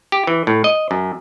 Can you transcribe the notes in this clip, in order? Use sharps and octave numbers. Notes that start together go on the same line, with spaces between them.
G4
E3
A2
D#5
F#2